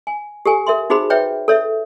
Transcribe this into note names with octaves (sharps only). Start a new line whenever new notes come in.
G#5
G4 A4 G#5
A#4 E5 C6
D#4 F#4 G#4 C5 B5
B4 C#5 E5 G5
A4 C#5 E5